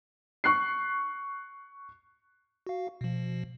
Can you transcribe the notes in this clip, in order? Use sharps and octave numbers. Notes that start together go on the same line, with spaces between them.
C#6 F#6 C7
F#4 F5
B2 F3